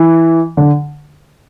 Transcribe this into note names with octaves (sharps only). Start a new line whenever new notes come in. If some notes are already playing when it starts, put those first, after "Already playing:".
Already playing: E3
D3